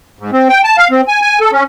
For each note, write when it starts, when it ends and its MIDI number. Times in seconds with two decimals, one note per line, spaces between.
0.19 0.31 44
0.33 0.48 60
0.49 0.62 79
0.64 0.77 81
0.77 0.88 77
0.91 1.01 60
1.08 1.21 80
1.22 1.39 80
1.40 1.51 69
1.52 1.63 61